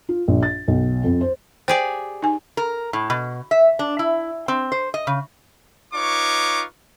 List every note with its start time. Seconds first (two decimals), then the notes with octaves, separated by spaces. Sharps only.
0.09 F4
0.28 A#1
0.43 A6
0.68 B1
1.04 F2
1.21 C5
1.68 G4 G#4 C5 D5
2.22 D#4 G#5
2.57 A#4
2.93 A2
3.10 B2
3.51 E5
3.79 D4
3.99 E4
4.48 C4
4.72 C5
4.94 D#5
5.07 C#3
5.93 D#4 F4 B4 C#5 C#6 D6